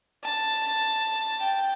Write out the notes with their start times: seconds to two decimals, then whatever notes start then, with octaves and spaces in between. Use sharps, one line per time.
0.24 A5
1.40 G5